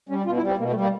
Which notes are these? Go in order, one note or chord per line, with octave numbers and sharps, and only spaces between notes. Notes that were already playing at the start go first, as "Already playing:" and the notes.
G3 C#4
B2 F4
E4
G3
C4
B2 A#3
A3
G3
A#3